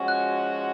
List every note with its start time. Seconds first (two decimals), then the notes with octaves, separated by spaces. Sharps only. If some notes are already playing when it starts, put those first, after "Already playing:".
Already playing: F3 G#3 C#4 F#4
0.08 F#6